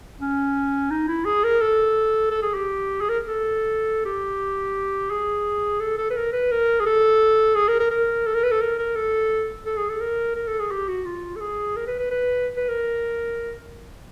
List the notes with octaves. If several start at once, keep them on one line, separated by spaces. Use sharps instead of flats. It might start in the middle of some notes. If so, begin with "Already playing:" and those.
C#4
D#4
E4
G#4
A#4
A4
A4
G#4
G4
G#4
A#4
A4
G4
G#4
A4
A4
B4
A#4
B4
A#4
G#4
A4
G#4
A#4
A#4
A#4
A4
A#4
B4
A4
A#4
A#4
A4
A4
G#4
A4
A#4
A#4
A4
G#4
G4
F#4
F4
A4
G#4
A#4
B4
B4
B4
B4
A#4